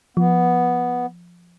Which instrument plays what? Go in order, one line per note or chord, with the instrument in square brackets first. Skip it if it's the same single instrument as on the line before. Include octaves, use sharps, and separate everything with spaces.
[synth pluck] F3 [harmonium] B3